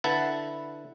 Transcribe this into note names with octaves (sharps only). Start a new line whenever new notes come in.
D3 E4 B4 F#5 A5